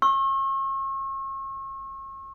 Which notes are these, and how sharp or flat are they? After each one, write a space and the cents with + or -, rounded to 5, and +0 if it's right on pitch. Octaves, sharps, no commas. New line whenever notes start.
C#6 -40 E6 +0